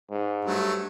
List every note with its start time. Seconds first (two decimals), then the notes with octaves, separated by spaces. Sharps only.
0.11 G#2
0.45 G2 F#3 A3